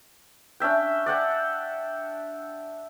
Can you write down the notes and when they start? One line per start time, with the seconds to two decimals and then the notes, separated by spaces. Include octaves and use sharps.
0.60 C#4 D4 E5 G5
1.06 D5 F#5 G5